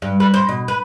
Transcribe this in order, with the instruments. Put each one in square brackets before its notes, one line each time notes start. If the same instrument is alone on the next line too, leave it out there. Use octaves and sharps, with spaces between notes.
[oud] G2
B4
C5
B2
B4